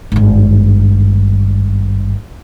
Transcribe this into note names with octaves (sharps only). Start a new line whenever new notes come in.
G#1 G2